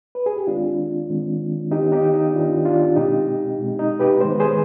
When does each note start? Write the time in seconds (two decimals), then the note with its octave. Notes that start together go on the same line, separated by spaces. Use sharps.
0.15 B4
0.26 G#4
0.37 G4
0.47 D#3 G#3 C4 D4 F4
1.10 D#3 G#3 C4
1.71 D#3 B3 D#4 G4
1.92 D#4 G4
2.14 D#4
2.33 D#3 B3 D4 F4
2.65 D4 F4
2.96 B2 G#3 C4 D#4 G4
3.59 B2 G#3 C4
3.79 D#4
3.99 G4 B4
4.21 D#3 G#3 B3 C5
4.30 B4
4.40 G#4 C5